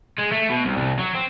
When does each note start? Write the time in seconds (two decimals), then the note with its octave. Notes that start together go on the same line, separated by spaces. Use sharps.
0.18 G#3
0.32 A3
0.50 B2
0.65 C2
0.77 C2
0.99 F#3
1.14 C4